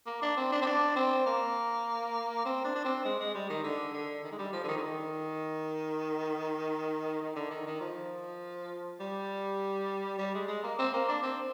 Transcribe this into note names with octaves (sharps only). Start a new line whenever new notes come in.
A#3
D4
C4
D4
C4
D4
C4
A#3
C4
D4
D4
C4
G#3
G#3
G3
D#3
D3
D3
D#3
G#3
G3
F3
D3
D#3
D3
D#3
D#3
D3
D#3
D#3
F3
G3
G3
G#3
G#3
A#3
C4
A#3
D4
C4